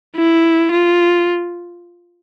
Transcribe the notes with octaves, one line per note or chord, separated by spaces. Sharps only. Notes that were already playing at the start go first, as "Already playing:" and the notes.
E4
F4